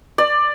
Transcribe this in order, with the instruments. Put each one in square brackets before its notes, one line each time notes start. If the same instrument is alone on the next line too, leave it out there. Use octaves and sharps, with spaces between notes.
[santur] D5